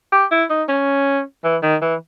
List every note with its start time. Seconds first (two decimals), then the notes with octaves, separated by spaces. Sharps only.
0.12 G4
0.31 E4
0.50 D#4
0.69 C#4
1.44 E3
1.63 D#3
1.82 E3